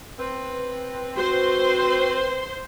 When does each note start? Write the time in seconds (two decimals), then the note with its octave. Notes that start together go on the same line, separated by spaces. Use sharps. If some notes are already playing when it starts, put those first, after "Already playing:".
0.18 C4 B4
1.17 F#4 C5 C6